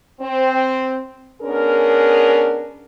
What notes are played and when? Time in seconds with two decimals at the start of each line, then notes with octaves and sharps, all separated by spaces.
0.21 C4
1.42 B3 C#4 D4 G#4 A#4